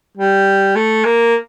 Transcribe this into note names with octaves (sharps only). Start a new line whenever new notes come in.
G3
A3
A#3